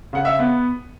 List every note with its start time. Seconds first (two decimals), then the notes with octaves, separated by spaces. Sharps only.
0.13 C#3 F#5
0.25 E5
0.39 B3